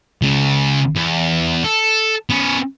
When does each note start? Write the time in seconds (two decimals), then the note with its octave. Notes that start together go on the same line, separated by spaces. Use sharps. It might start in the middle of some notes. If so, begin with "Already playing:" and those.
0.22 C#2 C#3
0.96 E2
1.64 A4
2.30 B3 C#4